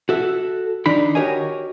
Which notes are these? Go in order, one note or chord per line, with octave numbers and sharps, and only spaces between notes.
F#4 A4 E5
D#3 D4 D#4 B5
F#4 G4 A#4 C#5 D#5 G#5